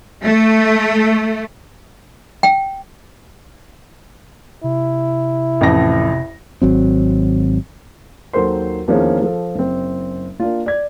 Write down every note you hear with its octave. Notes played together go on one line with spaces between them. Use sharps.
A3
G5
C3 E4
A1 F2 A#6
G#1 F#3 C4
D#2 F#3 A4 A#4 C5 C6
E2 D#3 F3 A#3 C4 C#4
F3 A4
F#1 C4
A#3 D4 F4
D5 G#6